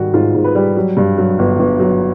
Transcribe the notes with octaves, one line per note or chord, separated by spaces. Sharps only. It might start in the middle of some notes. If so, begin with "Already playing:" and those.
Already playing: G#2 D#3 G3 F#4
G#2 F4
G#2
B4
G3
F#3
G2
F#3
G1
G1
F#3